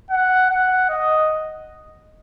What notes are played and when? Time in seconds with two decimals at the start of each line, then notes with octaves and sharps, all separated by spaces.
0.10 F#5
0.50 F#5
0.89 D#5